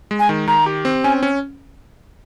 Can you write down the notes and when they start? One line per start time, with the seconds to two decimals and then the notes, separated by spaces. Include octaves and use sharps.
0.11 G#3
0.20 G#5
0.29 D#3
0.48 D#3 A#5
0.66 G4
0.85 C4
1.04 C#4 G#5
1.23 C#4